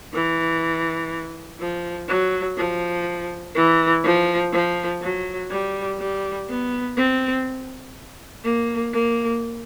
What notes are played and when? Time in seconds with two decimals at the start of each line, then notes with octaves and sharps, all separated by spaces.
0.14 E3
1.60 F3
2.09 F#3
2.57 F3
3.56 E3
4.04 F3
4.53 F3
5.02 F#3
5.51 G3
5.99 G3
6.49 B3
6.97 C4
8.44 A#3
8.93 A#3